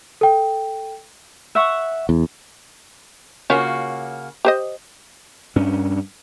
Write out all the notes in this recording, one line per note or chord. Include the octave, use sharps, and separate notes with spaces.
A4 G5
E5 F#5 C#6
E2
C#3 A#3 C#4 F4 F#4 C#5
G4 C5 D#5
G2 C#4 D4